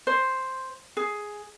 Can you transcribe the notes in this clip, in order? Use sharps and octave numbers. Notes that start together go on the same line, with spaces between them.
C5
G#4